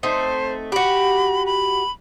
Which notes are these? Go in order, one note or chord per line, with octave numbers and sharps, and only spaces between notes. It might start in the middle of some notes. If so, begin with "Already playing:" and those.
A3 C4 D#4 C5
F#4 G4 B5
B5